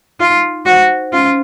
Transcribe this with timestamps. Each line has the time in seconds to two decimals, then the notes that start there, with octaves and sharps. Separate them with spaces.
0.20 D#4 F4
0.66 F#4 C5
1.13 C#4 F4